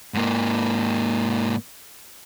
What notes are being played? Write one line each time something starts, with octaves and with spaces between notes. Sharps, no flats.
G#2 A#3